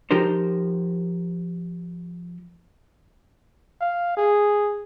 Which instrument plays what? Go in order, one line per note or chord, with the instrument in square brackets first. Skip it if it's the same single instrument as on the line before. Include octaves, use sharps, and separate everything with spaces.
[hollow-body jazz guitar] F3 D#4 G4 A#4 C5
[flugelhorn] F5
G#4